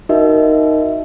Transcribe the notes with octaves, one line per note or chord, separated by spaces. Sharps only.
D#4 F#4 A#4 D#5 E5